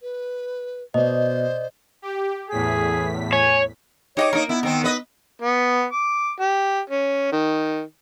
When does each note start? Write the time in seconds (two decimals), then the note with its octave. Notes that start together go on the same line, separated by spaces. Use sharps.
0.01 B4
0.94 B2 C5 D5 D#5
2.02 G4
2.50 E2 A2 G#4 B6
3.33 C#5 G#5
4.17 D#4 G4 C#5 D#5 D6
4.33 A#3 D#4 A#4
4.49 B3 E4
4.63 D#3 C4 A#4
4.84 B4 D#5
5.42 B3
5.92 D6
6.40 G4
6.90 C#4
7.32 D#3